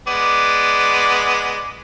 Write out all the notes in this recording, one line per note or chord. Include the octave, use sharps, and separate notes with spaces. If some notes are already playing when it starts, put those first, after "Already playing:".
G#3 B3 D5